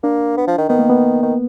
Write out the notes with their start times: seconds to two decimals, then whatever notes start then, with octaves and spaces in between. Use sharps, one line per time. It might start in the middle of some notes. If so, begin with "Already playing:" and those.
0.03 A#3 D4
0.37 B3
0.48 F3
0.58 D#3
0.69 D#3 B3
0.79 A#3
0.90 B3
1.23 D#3